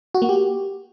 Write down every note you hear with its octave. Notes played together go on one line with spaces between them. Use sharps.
F#4
A#3
G4